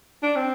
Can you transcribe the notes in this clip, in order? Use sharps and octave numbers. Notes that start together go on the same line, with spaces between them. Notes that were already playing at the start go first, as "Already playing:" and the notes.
D4
C4